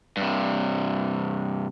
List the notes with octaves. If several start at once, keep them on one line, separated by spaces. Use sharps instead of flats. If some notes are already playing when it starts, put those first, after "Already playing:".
G2 C3